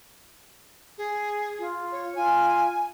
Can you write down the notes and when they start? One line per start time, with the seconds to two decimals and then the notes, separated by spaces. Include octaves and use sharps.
0.98 G#4
1.59 F4
1.92 C#5
2.15 F4 G#5